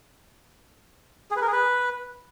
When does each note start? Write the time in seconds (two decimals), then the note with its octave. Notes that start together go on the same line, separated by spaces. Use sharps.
1.31 G#4
1.36 B4
1.42 A#4
1.47 G#4
1.52 B4